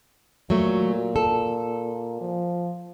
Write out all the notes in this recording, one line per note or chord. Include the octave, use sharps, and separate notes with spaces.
A#2 F#3 A3
A4
F3